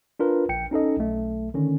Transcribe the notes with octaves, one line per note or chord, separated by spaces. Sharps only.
D4 F4 A#4 B4
A#1 G5 C#7
C#4 D#4 A4 D#5
B1 A3
D3 D#3 C#4